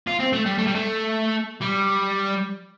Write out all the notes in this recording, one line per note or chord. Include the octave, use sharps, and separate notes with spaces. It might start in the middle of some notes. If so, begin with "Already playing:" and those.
F4
C4
A3
G3
A3
G3
A3
G3